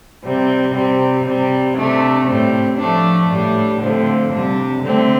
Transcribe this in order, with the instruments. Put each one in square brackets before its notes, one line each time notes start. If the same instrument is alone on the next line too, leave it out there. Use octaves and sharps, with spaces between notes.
[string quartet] C3 G3 C4
C3 G3 C4
C3 G3 C4
C3 A3 D4
A2 G3 C4
F3 A3 D4
A2 G3 D4
D3 F3 A3 C4
C3 G3 D4
D3 A3 C4